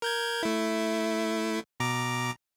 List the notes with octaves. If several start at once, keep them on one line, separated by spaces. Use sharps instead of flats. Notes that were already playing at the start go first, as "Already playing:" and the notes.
A#4 G6 G#6
A3 E4
B2 A#5 D6